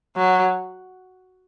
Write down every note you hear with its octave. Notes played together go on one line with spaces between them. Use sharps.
F#3